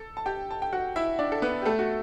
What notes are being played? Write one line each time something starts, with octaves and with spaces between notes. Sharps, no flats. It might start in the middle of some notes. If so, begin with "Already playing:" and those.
Already playing: A4
A5
G4 G5
A5
G5
F#4 F#5
E4 E5
D4 D5
A4
B3 B4
G4
A3 A4
F#4